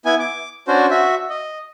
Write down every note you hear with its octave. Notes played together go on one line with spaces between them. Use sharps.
B3 E4 G#5
D6
C#4 D4 F#4 C5
F#4 E5
D#5